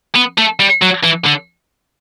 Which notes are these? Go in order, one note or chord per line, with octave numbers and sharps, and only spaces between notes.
B3
A3
G3
F#3
E3
D3